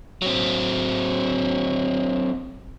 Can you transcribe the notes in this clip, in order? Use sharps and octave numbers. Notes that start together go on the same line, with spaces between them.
F#3 C4